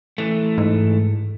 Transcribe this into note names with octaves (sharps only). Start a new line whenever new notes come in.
E3 A3
G#2